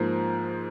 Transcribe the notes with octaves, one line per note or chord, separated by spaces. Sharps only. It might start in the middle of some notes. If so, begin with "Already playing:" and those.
Already playing: G#2 F3 A#3